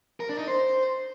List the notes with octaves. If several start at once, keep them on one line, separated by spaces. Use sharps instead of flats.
A#4
D4
D#4
C5